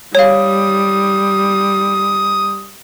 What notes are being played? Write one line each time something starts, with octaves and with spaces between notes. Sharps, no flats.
G3 C#5 F5 D#6